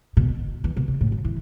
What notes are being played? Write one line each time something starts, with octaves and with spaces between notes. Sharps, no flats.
B2
E3
B2
C3
A2
F#2
E3